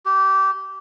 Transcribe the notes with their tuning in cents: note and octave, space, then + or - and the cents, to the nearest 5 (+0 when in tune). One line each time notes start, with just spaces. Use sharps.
G4 -20